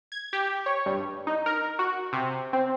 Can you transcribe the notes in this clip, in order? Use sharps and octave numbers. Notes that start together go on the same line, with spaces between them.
G#6
G4
C#5
G2
D#4
A#4
F#4
C3
C4